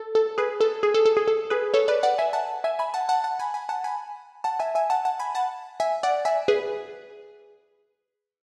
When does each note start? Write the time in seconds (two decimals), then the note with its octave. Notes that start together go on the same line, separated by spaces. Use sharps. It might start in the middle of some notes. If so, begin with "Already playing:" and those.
Already playing: A4
0.15 A4
0.38 G#4 B4
0.61 A4
0.83 G#4
0.94 A4
1.05 A4
1.17 G#4
1.28 A4
1.50 G#4 B4
1.74 A4 C#5
1.88 B4 D5
2.03 D5 F#5
2.18 E5 G#5
2.33 F#5 A5
2.64 E5 G#5
2.79 G#5 B5
2.94 F#5 A5
3.09 F#5 A5
3.24 F#5 A5
3.39 G#5 B5
3.54 G#5 B5
3.69 F#5 A5
3.84 G#5 B5
4.44 F#5 A5
4.60 E5 G#5
4.75 E5 G#5
4.90 F#5 A5
5.05 F#5 A5
5.20 G#5 B5
5.35 F#5 A5
5.80 E5 G#5
6.03 D5 F#5
6.25 E5 G#5
6.48 G#4 B4